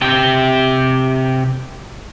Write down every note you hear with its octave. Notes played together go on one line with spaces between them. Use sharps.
C3 G4